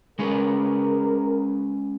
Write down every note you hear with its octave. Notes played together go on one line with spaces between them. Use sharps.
G#3 C#4 G#4 A#4 B4